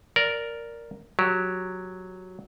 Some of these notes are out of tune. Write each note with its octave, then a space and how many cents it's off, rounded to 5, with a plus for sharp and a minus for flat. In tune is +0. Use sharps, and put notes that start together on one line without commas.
A#4 +0 D5 -10
F#3 -5 G4 +0